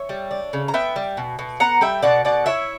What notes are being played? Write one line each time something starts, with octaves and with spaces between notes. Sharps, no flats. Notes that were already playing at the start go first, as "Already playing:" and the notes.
Already playing: C#5 E5
G3
D4
C#3
A#5
B3 E5 G5
G3
B2
B2
B3 F#5 A#5
G3 E5 G5
B2 D5 F#5
B2 D5 F#5
E4 C#5 E5